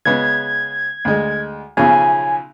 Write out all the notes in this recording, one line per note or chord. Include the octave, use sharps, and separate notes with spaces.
C#3 G#3 B3 G#6
D2 G#3
B1 C#3 F3 G#5